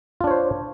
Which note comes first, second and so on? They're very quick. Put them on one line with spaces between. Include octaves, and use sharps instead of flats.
F4 D4 C#5 C5